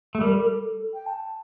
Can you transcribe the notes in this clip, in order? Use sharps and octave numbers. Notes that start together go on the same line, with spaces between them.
A3
G3 A#4
A4
A#4
A4
G5
A5